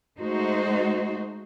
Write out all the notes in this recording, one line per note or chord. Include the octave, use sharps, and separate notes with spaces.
G#3 A3 D#4 F#4 C5